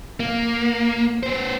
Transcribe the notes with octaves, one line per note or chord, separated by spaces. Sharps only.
A#3
B3 C5